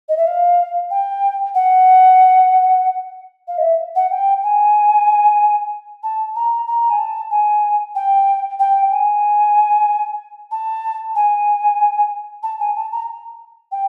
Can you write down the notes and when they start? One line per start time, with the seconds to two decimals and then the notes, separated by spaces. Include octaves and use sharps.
0.09 D#5
0.17 E5
0.27 F5
0.91 G5
1.55 F#5
3.48 F5
3.58 D#5
3.63 E5
3.95 F#5
4.11 G5
4.43 G#5
6.03 A5
6.36 A#5
6.67 A#5
6.90 G#5
6.99 A5
7.31 G#5
7.95 G5
8.60 G5
8.91 G#5
10.51 A5
11.15 G#5
12.43 A5
12.60 G#5
12.76 A5
12.92 A#5
13.72 G5